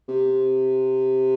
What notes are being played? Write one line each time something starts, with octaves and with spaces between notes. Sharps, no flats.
C3